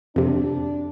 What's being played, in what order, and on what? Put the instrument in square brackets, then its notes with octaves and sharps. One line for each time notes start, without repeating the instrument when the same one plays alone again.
[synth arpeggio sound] F2 C3 [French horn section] D4